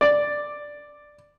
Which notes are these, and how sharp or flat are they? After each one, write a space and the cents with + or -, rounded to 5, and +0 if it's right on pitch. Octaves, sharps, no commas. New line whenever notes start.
D5 +5